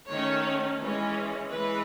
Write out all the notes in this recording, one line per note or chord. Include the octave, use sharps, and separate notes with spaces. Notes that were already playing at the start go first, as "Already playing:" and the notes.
D#3 A3 C#4 C#5
E3 G#3 C#4
E3 G#3 B4